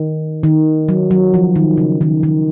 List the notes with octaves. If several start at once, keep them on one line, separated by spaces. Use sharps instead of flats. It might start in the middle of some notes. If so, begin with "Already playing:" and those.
Already playing: D#3
D#3
F#3
F#3
F3
D#3
C#3
D#3
D#3